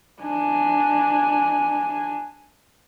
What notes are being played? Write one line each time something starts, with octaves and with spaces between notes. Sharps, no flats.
D4 G#5